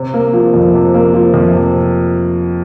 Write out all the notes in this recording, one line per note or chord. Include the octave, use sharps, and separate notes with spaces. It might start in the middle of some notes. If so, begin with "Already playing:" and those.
Already playing: C3
A#3
F3
F2
C3
A#3
F3
F2
C3